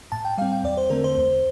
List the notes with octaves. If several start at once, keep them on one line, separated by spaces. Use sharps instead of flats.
A2 A5
G5
G3 C4 F5
G5
E2 D5
C5
D3 A3 C4 A#4
C5
E2